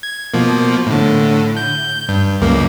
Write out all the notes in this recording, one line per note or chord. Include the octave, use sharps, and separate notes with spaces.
G#6
B2 F3 A#3
A2 D3
G6
G2
C#2 F#2 A#3